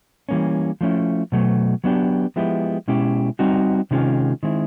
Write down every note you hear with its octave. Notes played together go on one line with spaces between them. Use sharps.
E3 G3 A#3 C#4
F3 A3 C#4 E4
B2 F#3 A3
F#3 B3 D4 G4
F3 G#3 B3 E4 G4
B2 G#3 C#4 E4 G4
G3 C4 D#4 F#4
C3 D#3 G#3 C#4 F4
D#3 G#3 C4 E4